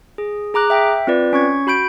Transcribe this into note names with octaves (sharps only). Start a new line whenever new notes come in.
G#4
G#4 A#5 D6 F#6
E5 G5
C4 F4 B4 D5
C#4 C#6 G#6
F#4 B5 G6 D7